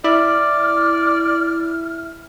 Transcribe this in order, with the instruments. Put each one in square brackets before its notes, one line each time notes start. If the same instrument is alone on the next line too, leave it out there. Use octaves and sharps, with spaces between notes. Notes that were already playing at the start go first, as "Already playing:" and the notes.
[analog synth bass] E4 [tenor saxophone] D5 [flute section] F6